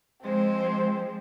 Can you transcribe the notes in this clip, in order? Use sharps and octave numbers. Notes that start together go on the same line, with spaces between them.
F3 G#3 C4 C5